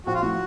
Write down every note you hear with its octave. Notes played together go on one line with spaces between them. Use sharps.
A#1 F#4
F4
A2 F3 F#4